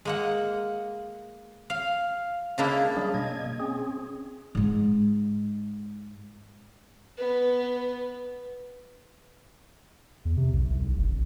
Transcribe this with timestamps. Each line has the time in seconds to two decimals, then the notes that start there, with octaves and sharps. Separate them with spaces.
0.05 G#3 A#3 F#5
1.70 F5
2.58 C#3 G#3 A#3 D4 E4
2.97 F#3 G3 C#4 D4 G#4
3.14 B2 A#3 D#5 G#6
3.60 C4 C#4 G#4
4.55 G#2 G#3
7.17 B3 B4
10.25 E2
10.37 C3
10.53 B1
10.70 C2
10.83 B1
10.97 F1
11.09 A1